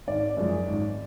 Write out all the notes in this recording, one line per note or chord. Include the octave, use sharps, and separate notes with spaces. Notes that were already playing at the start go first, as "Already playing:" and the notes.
G#1 D5
F#2 F3 G#3
G#1